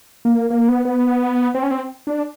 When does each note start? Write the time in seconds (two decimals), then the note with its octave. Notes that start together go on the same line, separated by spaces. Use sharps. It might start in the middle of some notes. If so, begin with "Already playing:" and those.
0.25 A#3
0.50 A#3
0.69 B3
0.85 B3
1.54 C4
1.63 C#4
1.71 C4
2.07 D4